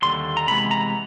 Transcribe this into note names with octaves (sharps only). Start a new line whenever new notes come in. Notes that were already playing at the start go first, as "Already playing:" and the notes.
D#2 D3 G3 C6
A#5
C3 E3 G#3 B3 B5
A#5